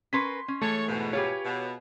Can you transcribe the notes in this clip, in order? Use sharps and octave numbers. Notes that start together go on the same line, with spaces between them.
C#4 A#4 B4 C6 B6
C#4
E3 G#3 A3 A4 C#5
E2 G#2 B2
F4 G4 G#4 B4 C#5
B2